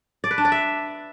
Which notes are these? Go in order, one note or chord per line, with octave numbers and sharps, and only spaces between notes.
D5
B4
D4
D5
E5